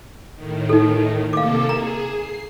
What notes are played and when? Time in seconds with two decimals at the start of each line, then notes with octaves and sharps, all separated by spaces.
0.35 A2 D#3
0.69 D#4 A4
1.33 C3 A#3 A4 F5 D6
1.69 G#4 A#5
2.15 C7